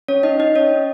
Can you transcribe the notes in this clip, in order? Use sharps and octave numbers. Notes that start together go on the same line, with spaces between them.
C#4 C#5
D#4 D#5
D#4 D#5
C#4 C#5